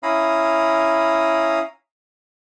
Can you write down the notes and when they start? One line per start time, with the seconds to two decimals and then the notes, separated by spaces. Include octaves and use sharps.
0.03 C#4 E4 F5 A#5 B5 D#6